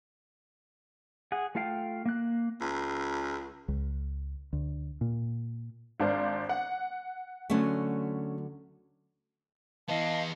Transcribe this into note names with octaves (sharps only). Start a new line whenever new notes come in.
G#4 F#5 F#6
A3 F4 A4 F5 G5
A#3 F#6
C#2
C#2
D2
A#2
G#1 D4 C5 F5
F#5
D2 D3 F#3 A3 C#4
E3 B3 D#5 F5 A5